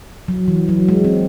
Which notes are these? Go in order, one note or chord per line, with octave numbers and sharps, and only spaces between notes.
F#3
E3
F#3
G#3
C4